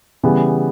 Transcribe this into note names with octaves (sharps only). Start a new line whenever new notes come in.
C#3 E3 G3 B3